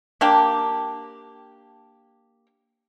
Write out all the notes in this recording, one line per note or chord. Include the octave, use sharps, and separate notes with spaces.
A#3 D4 G4